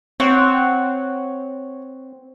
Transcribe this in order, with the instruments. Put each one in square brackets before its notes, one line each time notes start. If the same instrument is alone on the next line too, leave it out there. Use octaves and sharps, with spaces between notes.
[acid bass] C4 [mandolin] C#5 F#5